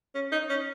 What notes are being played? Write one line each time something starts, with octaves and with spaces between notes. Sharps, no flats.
C#4
D#4
C#4